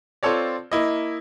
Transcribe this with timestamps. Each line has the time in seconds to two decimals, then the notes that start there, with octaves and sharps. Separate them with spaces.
0.23 C4 F4 A4 C#5 D5
0.72 A#3 E4 D#5